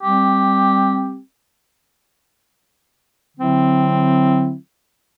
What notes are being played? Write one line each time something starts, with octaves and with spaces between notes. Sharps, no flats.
G3 C4 G4
D3 F#3 C4 E4